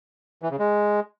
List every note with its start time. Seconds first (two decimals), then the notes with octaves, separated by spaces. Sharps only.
0.42 E3
0.51 C#3
0.59 G#3